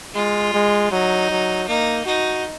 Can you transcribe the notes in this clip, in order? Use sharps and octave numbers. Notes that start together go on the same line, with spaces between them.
G#3 F4
G#3
F#3 D#4
F#3
A#3 D#4
D#4 F#4